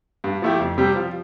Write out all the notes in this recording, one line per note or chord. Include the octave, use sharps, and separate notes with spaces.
G2
F3 A3 E4 G4
F2
C3 G3 C4 G4
F3